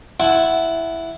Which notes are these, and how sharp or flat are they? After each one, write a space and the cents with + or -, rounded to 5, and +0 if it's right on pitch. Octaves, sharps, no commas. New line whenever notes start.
E4 +0 F#5 +0 A5 -25